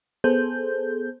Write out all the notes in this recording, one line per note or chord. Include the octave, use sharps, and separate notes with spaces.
B3 G#4 A4 C5 G6